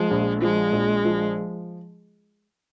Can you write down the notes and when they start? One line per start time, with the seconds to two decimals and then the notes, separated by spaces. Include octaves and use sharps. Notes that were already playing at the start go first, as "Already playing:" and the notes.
Already playing: F3 G#3
0.11 A#1
0.42 F3 G#3
0.73 A#1
1.05 F3